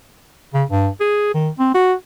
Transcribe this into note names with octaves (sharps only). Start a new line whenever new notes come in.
C#3
G2
G#4
D#3
C4
F#4